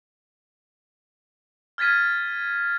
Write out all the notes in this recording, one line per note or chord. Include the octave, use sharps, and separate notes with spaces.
F6 G#6 A6 B6 D#7